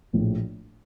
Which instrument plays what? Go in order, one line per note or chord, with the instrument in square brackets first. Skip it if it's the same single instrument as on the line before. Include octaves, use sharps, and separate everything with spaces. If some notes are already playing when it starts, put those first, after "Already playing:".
[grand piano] A#1 A2 F3 A3